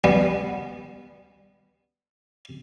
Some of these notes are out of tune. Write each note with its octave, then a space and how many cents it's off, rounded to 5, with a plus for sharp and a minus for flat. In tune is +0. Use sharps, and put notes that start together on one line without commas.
G3 +0 B3 -10